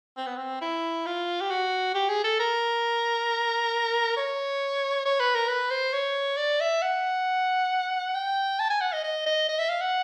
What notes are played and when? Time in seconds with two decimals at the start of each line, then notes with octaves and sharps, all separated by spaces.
0.17 C4
0.27 B3
0.37 C4
0.62 E4
1.06 F4
1.41 G4
1.51 F#4
1.95 G4
2.09 G#4
2.24 A4
2.40 A#4
4.17 C#5
5.05 C#5
5.20 B4
5.35 A#4
5.49 B4
5.71 C5
5.93 C#5
6.37 D5
6.60 E5
6.82 F#5
8.15 G5
8.60 A5
8.70 G#5
8.81 F#5
8.93 D#5
9.04 D#5
9.26 D#5
9.49 D#5
9.59 E5
9.69 F5
9.81 F#5